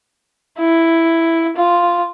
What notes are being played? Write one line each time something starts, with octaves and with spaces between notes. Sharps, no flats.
E4
F4